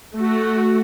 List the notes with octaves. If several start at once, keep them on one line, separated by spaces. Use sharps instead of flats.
A3 F#4